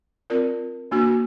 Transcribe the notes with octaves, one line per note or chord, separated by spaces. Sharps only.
C4 F4 A#4 D5
A#3 D4 F#4